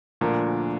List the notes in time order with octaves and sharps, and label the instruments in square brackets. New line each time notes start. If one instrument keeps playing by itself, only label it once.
[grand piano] D2 D3 F3 D4 A#4 [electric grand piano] A#2